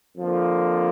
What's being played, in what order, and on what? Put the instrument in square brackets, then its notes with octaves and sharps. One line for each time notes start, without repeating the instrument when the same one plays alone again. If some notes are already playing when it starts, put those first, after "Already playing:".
[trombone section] F2 D3 F3 A#3